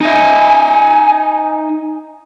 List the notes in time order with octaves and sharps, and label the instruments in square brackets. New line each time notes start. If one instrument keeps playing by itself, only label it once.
[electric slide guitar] D#4 D#5 E5 [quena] G#5